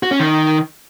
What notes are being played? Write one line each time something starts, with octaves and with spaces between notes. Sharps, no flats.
F#4
C#4
D#3